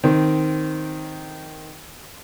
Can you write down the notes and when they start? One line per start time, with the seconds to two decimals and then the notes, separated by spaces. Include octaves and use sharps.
0.04 D#3 C4